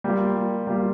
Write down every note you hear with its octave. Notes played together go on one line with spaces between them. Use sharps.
G3 A#3 F4
G3 A#3 F4